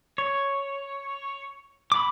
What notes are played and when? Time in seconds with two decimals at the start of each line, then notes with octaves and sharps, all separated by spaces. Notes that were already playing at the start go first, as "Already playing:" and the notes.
0.18 C#5
1.92 B5 D6